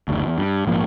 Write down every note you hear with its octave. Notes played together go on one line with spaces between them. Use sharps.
F#1 D2
E2
G2
A#1 G#2 F3 A#3